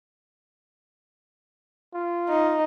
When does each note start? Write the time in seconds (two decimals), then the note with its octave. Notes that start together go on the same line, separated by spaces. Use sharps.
1.94 F4
2.29 D#4